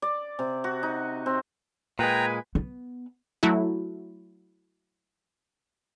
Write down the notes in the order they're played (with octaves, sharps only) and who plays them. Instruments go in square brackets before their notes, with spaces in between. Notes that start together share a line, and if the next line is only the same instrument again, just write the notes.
[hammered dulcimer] D5
C3
F#4
D#4
C4
[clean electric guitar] A#2 G#3 [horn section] B4 G#5 [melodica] G5 A#5
[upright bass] B3
[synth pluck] F#3 A3 E4 F#4